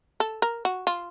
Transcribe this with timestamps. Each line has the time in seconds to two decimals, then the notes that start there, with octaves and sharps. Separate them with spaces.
0.20 A4
0.42 A#4
0.65 F#4
0.87 F4